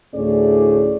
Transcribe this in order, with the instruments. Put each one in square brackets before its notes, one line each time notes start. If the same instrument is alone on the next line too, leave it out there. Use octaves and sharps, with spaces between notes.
[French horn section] D2 A2 A3 C#4 G#4 D5